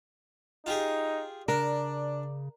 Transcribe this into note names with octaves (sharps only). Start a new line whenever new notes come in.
D#4 F4 G4 G#4
C#3 D4 A#4 D5